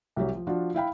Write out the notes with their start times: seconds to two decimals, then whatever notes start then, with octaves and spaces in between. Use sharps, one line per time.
0.16 C2 F#3 G4 C#5
0.34 F3
0.47 F3 D4 F4 F#4
0.74 E4 F5 G5 B5